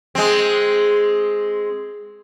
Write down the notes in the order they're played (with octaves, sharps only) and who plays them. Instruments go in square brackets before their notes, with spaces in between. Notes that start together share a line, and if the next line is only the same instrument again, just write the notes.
[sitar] G#3 C4